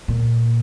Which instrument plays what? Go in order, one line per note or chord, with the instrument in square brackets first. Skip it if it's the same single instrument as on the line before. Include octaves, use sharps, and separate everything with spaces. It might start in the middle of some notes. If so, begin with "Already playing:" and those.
[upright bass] A#2